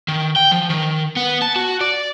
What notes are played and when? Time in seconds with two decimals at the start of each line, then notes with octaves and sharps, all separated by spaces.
0.08 D#3
0.36 G5
0.51 F3
0.70 D#3
1.16 B3
1.42 A5
1.56 F#4
1.81 D5